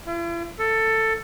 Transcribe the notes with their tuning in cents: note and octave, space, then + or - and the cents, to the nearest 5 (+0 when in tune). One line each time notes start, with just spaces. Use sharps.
E4 +45
A4 +15